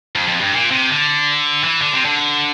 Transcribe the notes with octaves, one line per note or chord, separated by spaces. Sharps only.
F2
F2
G2
A#2
C3
D3
E3
D3
C3
D3